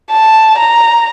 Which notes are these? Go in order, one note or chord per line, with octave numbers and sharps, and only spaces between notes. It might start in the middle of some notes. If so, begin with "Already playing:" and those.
A5
A#5